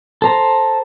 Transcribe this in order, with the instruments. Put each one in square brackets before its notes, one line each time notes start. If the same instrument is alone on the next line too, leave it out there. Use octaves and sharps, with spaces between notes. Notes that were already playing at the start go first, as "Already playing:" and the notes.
[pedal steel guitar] A4 C5 A#5